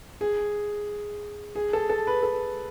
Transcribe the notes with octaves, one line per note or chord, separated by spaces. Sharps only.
G#4
G#4
A4
A4
B4
A4